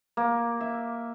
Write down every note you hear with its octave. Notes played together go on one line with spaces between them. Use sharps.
A#3
E5